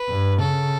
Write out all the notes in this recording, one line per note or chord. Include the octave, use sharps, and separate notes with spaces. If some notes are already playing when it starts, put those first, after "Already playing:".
Already playing: B4
G2
C#3 A4